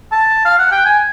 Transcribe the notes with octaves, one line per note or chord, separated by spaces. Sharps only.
A5
F5
F#5
G5
G#5